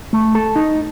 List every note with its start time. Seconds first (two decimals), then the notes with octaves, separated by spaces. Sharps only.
0.13 A3
0.35 A4
0.56 D#4